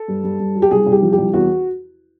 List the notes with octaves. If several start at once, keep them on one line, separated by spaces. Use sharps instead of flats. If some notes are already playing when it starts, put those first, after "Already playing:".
Already playing: A4
G2
G2
G2
F#3
G4
C2 G#4
C2
G4
F3
G4
C2
E2 F#4